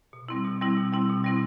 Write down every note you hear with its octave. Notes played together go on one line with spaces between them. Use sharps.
B2
G3 C4 E4
B2
G3 C4 E4
B2
G3 C4 E4
B2
G3 C4 E4